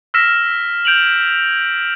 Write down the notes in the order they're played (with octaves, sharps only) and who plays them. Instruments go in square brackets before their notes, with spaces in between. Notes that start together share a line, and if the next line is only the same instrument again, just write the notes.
[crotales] E6 F6 A#6 B6 E7
G6 D7 F7 F#7